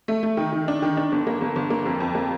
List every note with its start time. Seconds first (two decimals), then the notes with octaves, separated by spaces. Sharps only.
0.08 A3
0.23 A3
0.37 D#3
0.52 D#3
0.68 D4
0.82 D#3
0.97 D4
1.12 G1
1.27 A#3
1.41 G1
1.56 G1
1.70 A#3
1.86 F2
2.00 F2
2.15 A#3